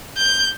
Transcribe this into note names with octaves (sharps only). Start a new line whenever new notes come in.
G6